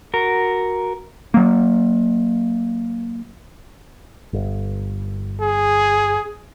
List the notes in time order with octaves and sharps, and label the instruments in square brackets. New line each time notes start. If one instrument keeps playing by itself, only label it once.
[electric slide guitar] F#4 A#4
[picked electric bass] F#3 A#3
G1
[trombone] G#4